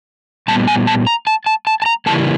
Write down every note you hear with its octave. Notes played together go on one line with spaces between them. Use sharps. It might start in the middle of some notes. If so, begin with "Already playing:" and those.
A#2 G3 B3 A5
G#5
A5
A#5
A5
A5
A5
A5
A#5
C#3 E3 G3 A#3 A5